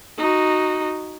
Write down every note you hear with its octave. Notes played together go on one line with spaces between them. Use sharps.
D#4 F#4